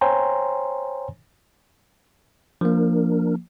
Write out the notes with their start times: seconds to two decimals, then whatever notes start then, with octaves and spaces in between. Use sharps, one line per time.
0.01 C5 C#5 G5 G#5 A#5 C6
2.61 F3 A#3 D4 A#4